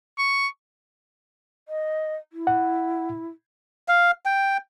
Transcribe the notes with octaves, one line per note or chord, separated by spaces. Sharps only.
C#6
D#5
E4
F#5
F5
G5